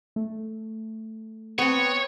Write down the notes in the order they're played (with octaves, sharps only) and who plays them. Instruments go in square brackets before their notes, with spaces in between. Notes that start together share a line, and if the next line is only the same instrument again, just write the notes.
[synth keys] A3
[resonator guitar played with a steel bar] B3 C4 [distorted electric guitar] C#5